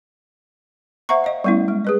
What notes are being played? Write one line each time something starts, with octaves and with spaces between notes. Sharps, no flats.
C5 E5 F#5 A#5 C#6
D#5 F5
G3 A3 B3 C#4 E4
G#3
G#4 B4 D#5